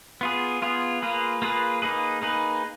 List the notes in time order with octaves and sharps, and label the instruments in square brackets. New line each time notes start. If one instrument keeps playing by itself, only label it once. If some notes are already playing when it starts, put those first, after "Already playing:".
[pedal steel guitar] B3 F4 G#4
B3 F4 G#4
A#3 F4 G#4 B4
A#3 F4 G#4 B4
A#3 D#4 G#4 B4
A#3 D#4 G#4 B4